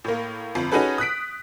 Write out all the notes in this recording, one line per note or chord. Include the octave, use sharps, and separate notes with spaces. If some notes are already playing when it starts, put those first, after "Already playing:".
A2 A#3
G1 F2
C#4 D#4 F#4 G#4 A4 B4
D#6 F#6 B6 D7